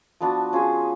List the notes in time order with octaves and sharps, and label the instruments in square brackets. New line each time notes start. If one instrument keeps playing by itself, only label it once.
[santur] F3 B3 D4 F#4
C#4 F4 G#4